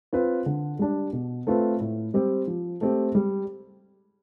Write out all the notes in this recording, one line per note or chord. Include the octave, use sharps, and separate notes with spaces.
C4 F4 B4
D3
G3 D4
B2
A3 C4 F4 B4
A2
G3 C4 G4
F3
A3 C4 G4
G3